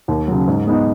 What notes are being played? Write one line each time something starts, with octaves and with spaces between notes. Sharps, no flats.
D#2
C#3 F#3
G#2
G#3 B3 D#4